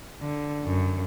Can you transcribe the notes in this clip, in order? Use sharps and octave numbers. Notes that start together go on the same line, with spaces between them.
D3
F#2